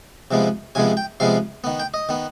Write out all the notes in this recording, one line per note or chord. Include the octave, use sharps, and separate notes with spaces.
C3 F3 G#3 B3
C3 F3 G#3 B3 G#5
G5
C3 F3 G#3 B3 F5
D#3 B3
G5
D#5
D#3 B3